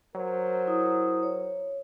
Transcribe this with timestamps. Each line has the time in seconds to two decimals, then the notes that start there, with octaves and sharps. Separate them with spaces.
0.15 F#3 A#4 C5
0.67 E4 D#6
1.23 C#5